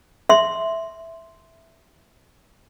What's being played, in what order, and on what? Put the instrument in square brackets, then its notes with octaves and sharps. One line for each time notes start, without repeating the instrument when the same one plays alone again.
[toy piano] E5 C6